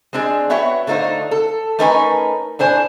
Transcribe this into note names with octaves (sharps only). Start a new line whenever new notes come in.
G#3 C4 D4 G#4
B3 F#4 C#5 E5 G5
D3 A3 D#4 F4 C5
A4
A3 C#4 D#4 A#4 B4 G#5
A2 D4 C5 G#5